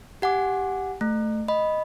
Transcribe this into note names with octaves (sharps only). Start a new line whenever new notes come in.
G4 F#5 G#5 D6
A3
D#5 B5